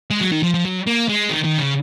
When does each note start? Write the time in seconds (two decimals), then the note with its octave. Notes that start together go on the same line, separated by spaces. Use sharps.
0.11 G#3
0.21 F#3
0.32 D#3
0.43 F3
0.54 F3
0.65 F#3
0.86 A#3
1.08 G#3
1.30 D#3
1.44 D#3
1.59 C#3